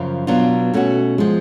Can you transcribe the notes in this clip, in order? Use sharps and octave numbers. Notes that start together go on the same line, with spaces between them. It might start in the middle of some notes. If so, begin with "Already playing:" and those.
Already playing: F#2 C#3 F3
B2 F#3 B3 D4 F4
B2 A3 C#4 F#4
F3 G#3